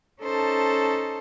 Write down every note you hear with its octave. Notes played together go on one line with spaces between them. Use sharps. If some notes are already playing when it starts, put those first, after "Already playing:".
C#4 D#4 A4 C5 A5